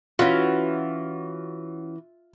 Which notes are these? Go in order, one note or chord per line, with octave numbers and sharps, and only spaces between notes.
E3 C#4 F4 F#4